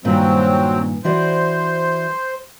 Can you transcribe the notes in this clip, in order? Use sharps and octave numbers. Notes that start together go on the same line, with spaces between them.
G2 A#2 D#3 F#3 C4
E3 F#4 C5 D5